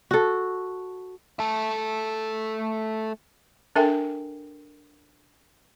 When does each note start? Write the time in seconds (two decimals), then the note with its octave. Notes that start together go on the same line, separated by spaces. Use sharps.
0.11 F#4 A4
1.40 A3 A4
3.76 D4 A4 A#4 E5 G5 G#5